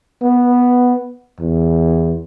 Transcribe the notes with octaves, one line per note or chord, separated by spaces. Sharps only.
B3
E2